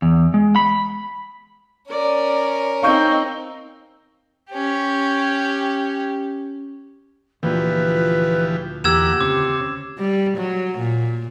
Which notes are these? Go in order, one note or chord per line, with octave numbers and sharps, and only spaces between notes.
E2
G#3
B5
C#4 A#4 D5
C4 D#4 F5 C#6 G6
C#4 G4
D2 A#2 E3 F3 G4 B4
E2 A#3 G4 F#5 E6 G#6 E7
C#3 C4 D6
G3
F#3
A#2